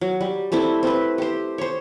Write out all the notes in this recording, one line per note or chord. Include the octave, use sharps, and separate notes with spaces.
F#3
G3
G3 A3 C4 E4
C4 B4
G4 C5
C5 C#5